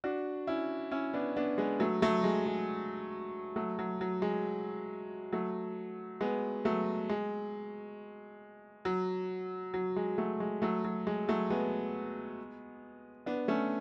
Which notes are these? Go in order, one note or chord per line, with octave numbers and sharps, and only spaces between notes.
D4 F#4
C#4 E4
C#4 E4
B3 D4
B3 D4
G#3 B3
F#3 A3
F#3 A3
G#3
G#3
F#3 A3
F#3
F#3
G#3
F#3 A3
G#3 B3
F#3 A3
G#3
F#3
F#3
G#3
F#3 A3
G#3
F#3 A3
F#3
G#3
F#3 A3
G#3 B3
B3 D4
A3 C#4